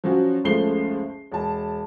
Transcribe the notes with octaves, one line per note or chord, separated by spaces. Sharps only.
F3 F#3 C#4 F#4
F#1 C#2 F3 A3 C7 G7
E1 A5